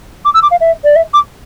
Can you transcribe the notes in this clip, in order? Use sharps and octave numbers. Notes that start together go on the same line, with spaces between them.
D6
E6
D6
F5
E5
D5
E5
D6